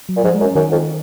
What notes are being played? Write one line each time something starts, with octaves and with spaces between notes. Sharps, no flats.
F#3
A#2
G#2 F3
G#3
F#2
C#4
F#2 D#3
F2